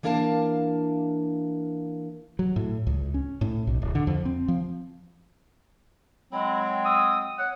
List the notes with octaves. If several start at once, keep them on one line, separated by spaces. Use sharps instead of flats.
E3 A#3 D4 A#4 F5 A5
F#3
A2
C#2
C#4
A2
B1
D1
D3
F2
C4
F3
F#3 G#3 C4 B5
D#6 E6
C#5 F#5